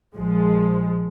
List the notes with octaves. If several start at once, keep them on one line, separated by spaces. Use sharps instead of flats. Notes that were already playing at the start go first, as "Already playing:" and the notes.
A#1 F3 G#3